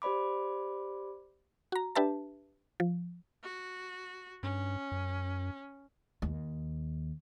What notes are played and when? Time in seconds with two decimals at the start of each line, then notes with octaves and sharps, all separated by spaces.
0.02 G4 C5 D5 B5 D6
1.72 F#4 A#5
1.95 D4 G4 B4 E5 A5
2.80 F3
3.43 F#4
4.43 G2 C#4
4.92 F#2
6.22 D#2